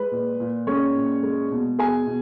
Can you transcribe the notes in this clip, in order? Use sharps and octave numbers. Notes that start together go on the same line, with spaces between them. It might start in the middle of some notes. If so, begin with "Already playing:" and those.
Already playing: G#3 B4
A#2
A#2
G#3 C#4 C#5
A#2
G#3
B2
B2 G#4 G#5
B2